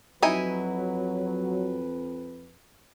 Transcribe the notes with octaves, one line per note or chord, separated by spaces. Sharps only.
F2 F#3 D#4 E4 B4 G#5